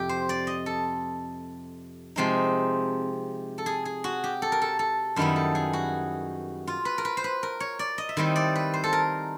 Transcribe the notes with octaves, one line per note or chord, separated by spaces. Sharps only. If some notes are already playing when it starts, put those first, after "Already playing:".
Already playing: F2 C3 G4
C5
D5
D#5
A4
C3 F3 G#3 C4 D#4
A4
G#4
G#4
F#4
G4
A4
A#4
A4
A4
F#2 D#3 G3 B3 E4
A4
G#4
F#4
F4
B4
A#4
B4
C5
B4
A#4
C#5
D5
D#5
E5
D#3 G3 C4 E4 D#5
D5
B4
C5
A4
A#4